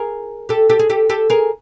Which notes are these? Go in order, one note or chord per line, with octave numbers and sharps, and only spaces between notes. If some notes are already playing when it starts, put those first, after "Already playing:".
Already playing: G#4 A#4
G4 A4
G4 A4
G#4
G4 A4
G4 A4
G#4 A#4